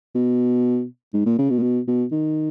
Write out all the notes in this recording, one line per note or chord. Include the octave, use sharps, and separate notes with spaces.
B2
G#2
A#2
C#3
B2
A#2
B2
B2
D#3